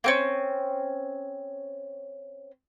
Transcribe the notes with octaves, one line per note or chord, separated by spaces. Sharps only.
A#3 C4 C#4